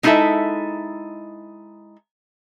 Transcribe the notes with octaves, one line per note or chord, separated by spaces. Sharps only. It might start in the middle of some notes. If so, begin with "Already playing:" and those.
G#3 D#4 E4 G#4 A4 E5